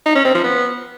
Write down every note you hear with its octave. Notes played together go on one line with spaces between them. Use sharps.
D#4
C#4
C4
F3
B3